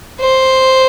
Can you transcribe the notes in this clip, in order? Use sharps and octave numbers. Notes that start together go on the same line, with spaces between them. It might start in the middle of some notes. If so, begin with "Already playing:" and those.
C5